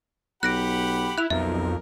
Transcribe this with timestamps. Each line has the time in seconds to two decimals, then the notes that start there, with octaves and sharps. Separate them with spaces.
0.43 B1 G4 F#5 B5 F#6 A#6 D7
1.18 E4 F#6 F7
1.30 B1 F2 A#4 E5